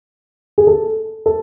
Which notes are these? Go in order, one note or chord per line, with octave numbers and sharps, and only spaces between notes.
G#4
A4
A4